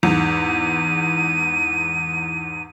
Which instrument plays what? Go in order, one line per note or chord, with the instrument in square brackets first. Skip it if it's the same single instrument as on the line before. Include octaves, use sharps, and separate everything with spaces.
[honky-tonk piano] E2 G#2 [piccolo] D#7